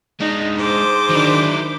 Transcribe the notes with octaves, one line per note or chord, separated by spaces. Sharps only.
G#3 D4 D#4
G#2 C5 D6
D#3 F#3 D4 E4